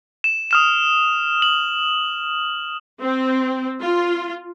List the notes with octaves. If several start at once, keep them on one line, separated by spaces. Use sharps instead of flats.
E7
D#6 F6 E7
F#7
C4
F4